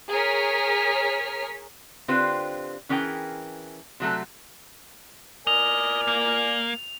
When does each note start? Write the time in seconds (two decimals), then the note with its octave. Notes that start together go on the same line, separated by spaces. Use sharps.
0.11 G#4 A#4 C#5 F6 B6
2.08 D3 C4 F4 G4 B4 C5
2.89 E3 C#4 G#4 A#4 G5
4.00 C3 F#3 A3 A4
5.47 A#4 D5 D#5 G#5 F7
6.08 A#3